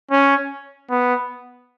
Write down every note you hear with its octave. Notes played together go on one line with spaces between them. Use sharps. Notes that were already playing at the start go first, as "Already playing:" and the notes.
C#4
B3